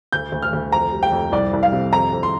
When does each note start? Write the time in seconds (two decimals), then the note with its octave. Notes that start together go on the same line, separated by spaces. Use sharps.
0.13 D2 G6
0.32 D2
0.42 F6
0.53 D2
0.72 F2 A#5
0.92 G3
1.03 G5
1.12 F2
1.32 C2 D5
1.53 C2
1.63 F5
1.72 C3
1.93 F2 A#5
2.13 F2
2.23 C6